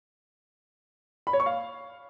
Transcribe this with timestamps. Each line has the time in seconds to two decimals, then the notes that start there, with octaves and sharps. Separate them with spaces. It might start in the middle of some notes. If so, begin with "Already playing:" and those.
1.27 B5
1.33 C#5
1.40 C#6
1.46 F5